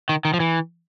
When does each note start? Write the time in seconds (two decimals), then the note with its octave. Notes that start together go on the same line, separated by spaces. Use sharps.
0.09 D#3
0.25 D#3
0.34 F3
0.40 E3